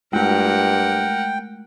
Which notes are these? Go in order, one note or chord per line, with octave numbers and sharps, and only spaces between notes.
G2 G#3 A3 A#4 F#5 G5